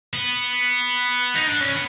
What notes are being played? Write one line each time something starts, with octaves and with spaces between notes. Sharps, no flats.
B3
D#4
D4
C#4